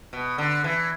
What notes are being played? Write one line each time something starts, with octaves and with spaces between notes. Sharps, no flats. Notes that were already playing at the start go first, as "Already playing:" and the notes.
B2
D3
E3